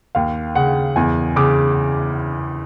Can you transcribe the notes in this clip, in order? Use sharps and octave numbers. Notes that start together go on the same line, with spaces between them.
D#2 F5
C#3 F#5
E2 G#5
C#3 D6